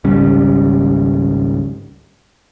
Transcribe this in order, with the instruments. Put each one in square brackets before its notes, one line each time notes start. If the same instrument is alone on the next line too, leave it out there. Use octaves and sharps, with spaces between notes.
[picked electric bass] G#1 C#2 G3 C#4